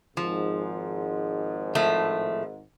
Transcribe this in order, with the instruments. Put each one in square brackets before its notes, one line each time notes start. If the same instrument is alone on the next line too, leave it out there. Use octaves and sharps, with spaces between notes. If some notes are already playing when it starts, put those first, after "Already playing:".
[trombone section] G#1 G#2 [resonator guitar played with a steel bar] F3
[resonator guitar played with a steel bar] A2 F3 A3